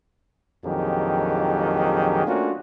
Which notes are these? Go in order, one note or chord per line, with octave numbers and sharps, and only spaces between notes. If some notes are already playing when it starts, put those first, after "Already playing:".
A#1 F2 D#3 F#3 G4 G#4
A3 A#3 C#4 D4 F4 F#4